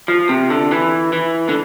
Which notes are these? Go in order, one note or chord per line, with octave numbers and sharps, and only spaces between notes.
F3
C3
D3
E3
E3
D3